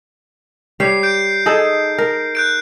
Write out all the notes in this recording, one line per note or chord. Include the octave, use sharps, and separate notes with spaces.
G3 G4 C#5 C7
G6 D7
D#4 G#4 A4
A#4
F#6 G6 D7